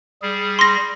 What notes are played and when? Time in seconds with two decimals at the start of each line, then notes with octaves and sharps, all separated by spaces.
0.22 G3 G#4
0.59 C6 A#6